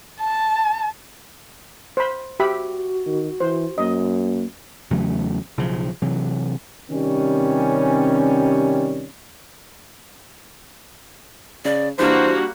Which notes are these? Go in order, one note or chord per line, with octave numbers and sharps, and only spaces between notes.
A5
C5 B5
F#4 G4 E5 B5
D#3
E3 C5
F#2 A#3 D#5
E2 C#3 F#3 A3
B1 C#3 F3
C3 E3 F#3
C3 D#3 G3 C#4
C#3 D5
E3 G3 A#3 D4 F#4 C5